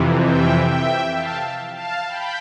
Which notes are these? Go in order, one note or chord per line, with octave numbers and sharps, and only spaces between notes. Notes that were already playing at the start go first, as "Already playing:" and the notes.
Already playing: F2 C3 E3
E5 G5
E5 G5
F5 A5
F5 A5
G5 B5